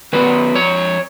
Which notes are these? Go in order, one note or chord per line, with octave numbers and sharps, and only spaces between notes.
D#3 F#3 B3 B4
F2 C#5